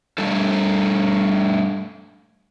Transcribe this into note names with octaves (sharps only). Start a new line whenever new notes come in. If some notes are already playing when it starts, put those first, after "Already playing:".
G3 A3 D4 A4